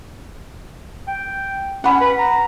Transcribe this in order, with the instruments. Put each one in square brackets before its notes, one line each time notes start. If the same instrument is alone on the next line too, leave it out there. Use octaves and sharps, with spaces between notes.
[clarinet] G5
[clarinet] C#4 [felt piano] F#5 B5
[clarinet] B4
A#5